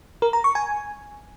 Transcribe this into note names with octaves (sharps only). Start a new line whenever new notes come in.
A#4
A#5
C#6
G#5